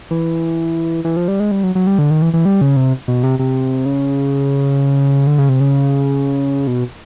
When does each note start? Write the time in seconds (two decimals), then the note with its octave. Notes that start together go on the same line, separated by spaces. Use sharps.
0.11 E3
1.04 E3
1.17 F3
1.28 G3
1.40 G#3
1.51 G3
1.63 F#3
1.75 F#3
1.87 G3
1.99 D3
2.11 D#3
2.22 E3
2.34 E3
2.45 G3
2.61 C#3
2.77 C3
3.08 B2
3.24 C3
3.39 C3
3.86 C#3
5.27 D3
5.38 C#3
5.49 C3
5.60 C#3
6.67 B2